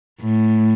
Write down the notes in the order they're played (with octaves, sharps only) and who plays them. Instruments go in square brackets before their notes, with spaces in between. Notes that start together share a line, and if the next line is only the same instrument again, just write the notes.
[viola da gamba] A2